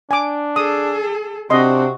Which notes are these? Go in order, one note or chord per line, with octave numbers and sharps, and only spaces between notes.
D4 G#5 D6
G#4 A4 D#6
C3 C4 D4 F#4 D#5 C6